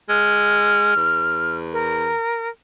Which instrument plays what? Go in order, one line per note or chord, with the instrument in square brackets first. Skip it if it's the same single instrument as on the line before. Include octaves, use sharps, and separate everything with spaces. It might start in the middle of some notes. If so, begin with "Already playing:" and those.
[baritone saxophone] G#3 [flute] F6
[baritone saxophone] E2
[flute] A#4